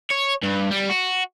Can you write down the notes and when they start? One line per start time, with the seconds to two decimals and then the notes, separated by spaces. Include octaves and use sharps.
0.11 C#5
0.43 G2
0.71 G3
0.89 F#4